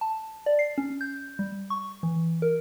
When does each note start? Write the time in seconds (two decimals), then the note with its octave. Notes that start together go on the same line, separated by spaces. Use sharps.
0.01 A5
0.46 D5
0.59 C7
0.78 C#4
1.01 G6
1.39 G3
1.70 C#6
2.03 E3
2.42 A#4